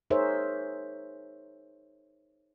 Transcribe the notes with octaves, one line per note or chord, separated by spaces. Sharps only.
D#4 G#4 A#4 C5 C#5 E5